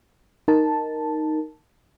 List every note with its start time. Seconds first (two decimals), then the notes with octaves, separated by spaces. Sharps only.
0.48 D#4 A#4 A5